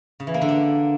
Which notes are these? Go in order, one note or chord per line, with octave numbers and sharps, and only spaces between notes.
C#3
E3
A#3
D3
D4